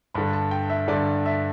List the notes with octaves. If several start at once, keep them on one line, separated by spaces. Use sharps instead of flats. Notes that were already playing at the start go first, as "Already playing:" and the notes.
G2 D3 B5
A5
G5
E5
G2 D3 D5
E5